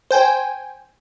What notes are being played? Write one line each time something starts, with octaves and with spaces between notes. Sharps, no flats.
C5 G5 G#5